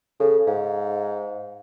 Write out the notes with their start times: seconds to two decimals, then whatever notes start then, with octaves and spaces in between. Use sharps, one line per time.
0.20 C#3 A4
0.47 G#2 F5